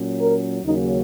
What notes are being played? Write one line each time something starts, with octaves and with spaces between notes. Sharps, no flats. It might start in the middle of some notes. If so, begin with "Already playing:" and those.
Already playing: A#2 F#3 C#4
A#4
D#2 C#3 F#3 A#3 C#4 D#4